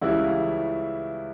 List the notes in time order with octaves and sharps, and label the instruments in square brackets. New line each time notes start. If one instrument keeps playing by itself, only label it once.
[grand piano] C#2 C#3 E3 G3 E4